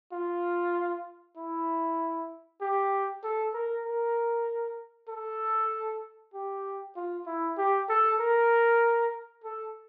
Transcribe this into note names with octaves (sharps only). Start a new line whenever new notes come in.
F4
E4
G4
A4
A#4
A#4
A4
G4
F4
E4
G4
A4
A#4
A4